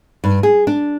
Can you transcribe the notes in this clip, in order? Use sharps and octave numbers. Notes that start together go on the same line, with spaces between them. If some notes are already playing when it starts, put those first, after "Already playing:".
G2
G#4
D4